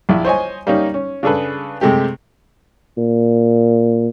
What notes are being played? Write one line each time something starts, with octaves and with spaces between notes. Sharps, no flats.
A#1 E4
C5 C#5 D#5 G#5
G3 A#3 C#4 D#4
C#4
C#3 D4 G#4 A4 B4
C3 G#3 A3 G4
A#2